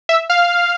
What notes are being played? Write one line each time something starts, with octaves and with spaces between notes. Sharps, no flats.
E5
F5